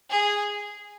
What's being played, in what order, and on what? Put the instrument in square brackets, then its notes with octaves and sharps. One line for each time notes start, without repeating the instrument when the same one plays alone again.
[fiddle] G#4